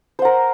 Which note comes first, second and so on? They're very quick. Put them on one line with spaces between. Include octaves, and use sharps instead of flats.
C5 F#5 A#4